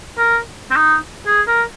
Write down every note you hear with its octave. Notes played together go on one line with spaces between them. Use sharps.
A#4
C4
D#4
G#4
A#4